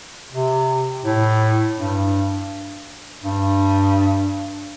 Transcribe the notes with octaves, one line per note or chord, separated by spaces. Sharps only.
C3
A2
G2
G2